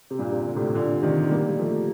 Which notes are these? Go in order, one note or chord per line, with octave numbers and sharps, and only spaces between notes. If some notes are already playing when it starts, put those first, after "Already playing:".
C3
G2 A#2
C3
D3
A2 C3
A#2 D3
C3 D#3
G3 A#3
G3
F3 A3